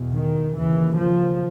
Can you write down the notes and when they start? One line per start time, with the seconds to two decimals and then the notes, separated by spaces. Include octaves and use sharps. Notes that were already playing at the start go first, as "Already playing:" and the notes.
Already playing: E2 B2
0.12 D#3
0.53 D#2 C#3 E3
0.95 F3